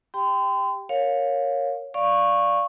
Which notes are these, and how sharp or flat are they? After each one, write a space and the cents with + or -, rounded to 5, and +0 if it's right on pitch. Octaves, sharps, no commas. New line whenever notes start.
G4 +5 G5 +0 C6 -40
A#4 +0 C#5 +0 F5 +20
D5 +0 F5 +0 C#6 -10